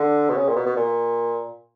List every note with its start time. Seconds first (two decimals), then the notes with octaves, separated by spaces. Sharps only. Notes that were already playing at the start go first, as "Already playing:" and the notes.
Already playing: D3
0.29 B2
0.36 C#3
0.49 A#2
0.56 B2
0.66 B2
0.76 A#2